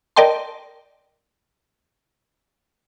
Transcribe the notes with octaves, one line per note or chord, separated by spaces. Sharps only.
A#4 D5 D#5 G5 A5 C6